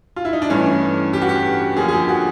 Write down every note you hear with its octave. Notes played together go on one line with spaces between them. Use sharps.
F4
E4
D#4
D4
G2 E3 A3 C#4
G4
F#4
G4
F#2 D3 F3 A#3 G#4
G#4
G4
F#4